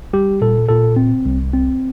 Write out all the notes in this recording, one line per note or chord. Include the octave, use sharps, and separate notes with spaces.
G3 G4
A#2 A4
A#2 A4
C4
C2
C4